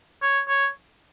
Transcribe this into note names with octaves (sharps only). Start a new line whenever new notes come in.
C#5
C#5